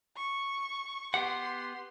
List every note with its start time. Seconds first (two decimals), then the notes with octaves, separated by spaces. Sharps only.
0.17 C#6
1.14 B3 G4 F#5 C6